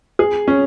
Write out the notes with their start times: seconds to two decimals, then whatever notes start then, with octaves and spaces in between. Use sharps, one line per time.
0.19 G#4
0.48 C#4